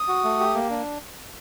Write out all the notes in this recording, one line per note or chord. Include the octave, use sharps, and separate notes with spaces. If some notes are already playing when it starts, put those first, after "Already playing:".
Already playing: D#6
F#4
A3
G4
A#3
D4